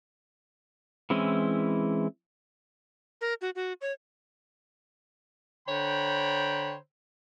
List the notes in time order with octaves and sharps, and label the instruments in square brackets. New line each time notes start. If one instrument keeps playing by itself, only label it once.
[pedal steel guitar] E3 G#3 C4 C#4 E4
[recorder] A#4
F#4
F#4
C#5
[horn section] D3 C5 C#5 G5 A#5 B5